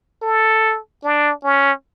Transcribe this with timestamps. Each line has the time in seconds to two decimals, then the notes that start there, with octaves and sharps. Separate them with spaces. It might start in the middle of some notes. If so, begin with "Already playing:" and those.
0.22 A4
1.04 D4
1.44 C#4